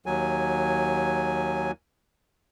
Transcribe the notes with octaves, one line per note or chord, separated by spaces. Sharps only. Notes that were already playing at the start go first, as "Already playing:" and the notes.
D#2 F#3 G#5